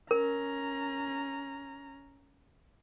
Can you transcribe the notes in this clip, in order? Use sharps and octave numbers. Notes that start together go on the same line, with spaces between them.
C#4 A#4 A#5